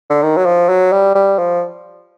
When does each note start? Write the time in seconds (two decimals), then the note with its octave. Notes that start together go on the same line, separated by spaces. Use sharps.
0.10 D3
0.22 D#3
0.37 F#3
0.46 F3
0.69 F#3
0.92 G3
1.15 G3
1.38 F3